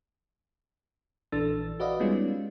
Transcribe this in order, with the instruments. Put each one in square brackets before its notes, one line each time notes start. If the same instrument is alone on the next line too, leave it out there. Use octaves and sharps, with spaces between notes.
[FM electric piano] A#1 E3 D4 A4 E6 A6
F#4 B4 D5 D#5 F5
G3 G#3 B3 C#4 D#4 F4